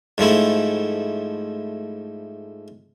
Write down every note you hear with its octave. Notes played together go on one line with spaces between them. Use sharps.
G#2 F3 A3 E4